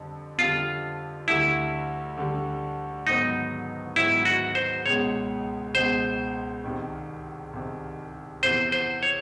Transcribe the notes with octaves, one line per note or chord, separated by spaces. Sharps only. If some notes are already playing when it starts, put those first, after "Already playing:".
Already playing: F2 D3 G3
F2 D3 G3 F4
D2 D3 G3 E4
D2 D3 G3
G#2 D#3 F#3 B3 D#4
G#2 D#3 F#3 B3 E4
F#4
C5
C#2 B2 G#3 C#5
C#2 B2 G#3 C5
C2 C3 D#3
C2 C3 D#3
E2 C3 E3 C5
C5
C#5